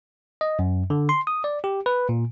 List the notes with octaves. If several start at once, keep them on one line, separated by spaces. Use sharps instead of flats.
D#5
F#2
D3
C6
D#6
D5
G4
B4
A#2